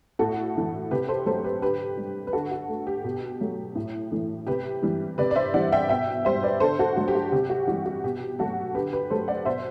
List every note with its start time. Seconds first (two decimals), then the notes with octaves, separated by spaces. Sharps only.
0.19 A2 F#4 A4
0.56 E3 A3
0.91 C3 G4 B4
1.08 A4 C5
1.26 F#3 A3 A4 C5
1.44 G4 B4
1.62 D3 G4 B4
1.97 G3
2.27 B4
2.33 D3 F#4 A4
2.51 F#4
2.68 A3
2.87 G4
3.04 B2
3.41 F#3 A3
3.76 A2
4.11 E3 A3
4.47 C3 G4 B4
4.82 E3 G3
5.18 C3 B4 D5
5.31 D5
5.36 C5 E5
5.54 E3 G3 D5 F#5
5.72 E5 G5
5.89 B2 E5 G5
6.25 G3 C5 E5
6.43 B4 D5
6.60 D3 A4 C5
6.79 F#4 A4
6.96 F#3 A3 F#4
7.08 G4
7.15 F#4
7.32 C3 G4
7.50 F#4
7.67 E3 G3 F#4
7.86 F#4
8.04 B2 G4
8.39 F#3 A3 F#4 A4
8.75 D3 G4 B4
8.93 G4 B4
9.10 F#3 A3 A4 C5
9.28 D5 F#5
9.45 B2 C5 E5